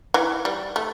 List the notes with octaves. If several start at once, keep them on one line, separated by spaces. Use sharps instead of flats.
E3
G3
A3